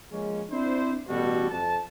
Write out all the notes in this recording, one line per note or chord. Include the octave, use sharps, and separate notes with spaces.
F3 G#3 A#3 C#4
C4 D4 E4 C5
A1 B2 G3 F#4 A4
F2 A5